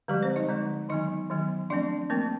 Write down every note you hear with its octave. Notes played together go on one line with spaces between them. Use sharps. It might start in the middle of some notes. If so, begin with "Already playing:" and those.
D3 F3 G3 G#3 G4
C4 C5
D#4 D#5
D3 F3 G#3
D#3 F#3 B3 D#4 D#5
D#3 F#3 B3
F3 A3 C4 D4 D5
F3 A3 A#3 C4 A#4